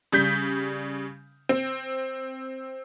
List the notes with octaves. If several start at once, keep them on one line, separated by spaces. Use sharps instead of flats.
C#3 G3 G6 B6
C4